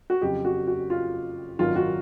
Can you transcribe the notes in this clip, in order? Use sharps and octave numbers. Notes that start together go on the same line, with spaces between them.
F#4
F2 C#3 F#3 G4
F#4
F#4
F4
G#1 F#2 D#3 F#3 F4
F#4